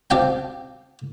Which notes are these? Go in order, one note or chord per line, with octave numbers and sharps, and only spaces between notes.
C4 G4 F5 G5 A5